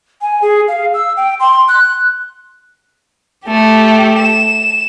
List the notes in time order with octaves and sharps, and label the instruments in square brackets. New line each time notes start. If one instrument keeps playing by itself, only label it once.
[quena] G#5
G#4
F5
E6
G5
C6
F#6
[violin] A3 G4
E7